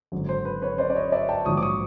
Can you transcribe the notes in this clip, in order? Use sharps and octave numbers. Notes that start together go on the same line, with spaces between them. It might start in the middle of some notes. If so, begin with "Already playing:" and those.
G#1 F#2 D3
C5
B4
B4 C#5
C5 D5
D5
C#5 D#5
D5 E5
G5 A5
A#1 G#2 D#3 F#3 C#6 D#6
D6
C#6 D#6